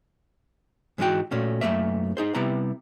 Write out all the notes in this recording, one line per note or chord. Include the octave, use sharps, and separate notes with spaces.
G#2 E3 G#3 D#4 F#4 G5
A#2 A3 C#4 F#4
F#2 B2 A3 A#3 E5
D#4 G#4 C5
C3 G3 B3 E4 A#5